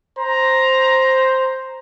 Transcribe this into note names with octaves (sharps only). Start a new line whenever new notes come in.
C5 A#5